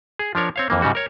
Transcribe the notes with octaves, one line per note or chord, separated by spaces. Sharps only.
G#4
F3 D4 A#4 C#5
C4 C#5 F5
F2 E3 A#3
G#2 C#3 G3 F#4
A#4 C#5